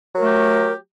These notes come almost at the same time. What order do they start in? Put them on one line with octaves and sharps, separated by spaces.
F#3 A#4 A3 G4